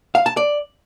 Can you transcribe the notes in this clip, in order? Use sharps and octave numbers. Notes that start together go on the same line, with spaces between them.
F5
A5
D5